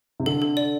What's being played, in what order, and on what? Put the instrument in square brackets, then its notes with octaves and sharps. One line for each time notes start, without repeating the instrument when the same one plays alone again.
[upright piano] C3
[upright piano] D3 [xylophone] A4
[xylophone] A4
D5